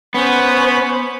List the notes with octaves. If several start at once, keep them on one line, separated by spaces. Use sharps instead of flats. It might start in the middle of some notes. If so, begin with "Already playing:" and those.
B3 C#4 C5 B5